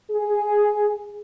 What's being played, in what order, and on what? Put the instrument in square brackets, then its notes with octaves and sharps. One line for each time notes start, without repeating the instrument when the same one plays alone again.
[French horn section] G#4